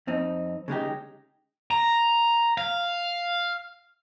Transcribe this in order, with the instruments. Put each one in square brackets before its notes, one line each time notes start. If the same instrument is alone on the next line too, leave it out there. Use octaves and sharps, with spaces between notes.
[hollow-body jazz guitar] F2 C4 D#4
C#3 G#3 D#4 G4
[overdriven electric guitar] A#5
F5